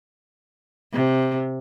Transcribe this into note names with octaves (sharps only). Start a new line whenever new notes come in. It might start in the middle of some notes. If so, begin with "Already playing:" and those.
C3